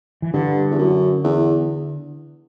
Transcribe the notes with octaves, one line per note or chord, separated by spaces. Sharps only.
E3
G2 D3
E2
F#2
E2